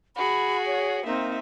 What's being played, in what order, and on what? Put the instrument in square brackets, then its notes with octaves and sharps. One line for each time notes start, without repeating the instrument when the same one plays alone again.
[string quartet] F#4 G#4 [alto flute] B5
[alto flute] C#5
[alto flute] A#3 [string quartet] C4 D#4 E5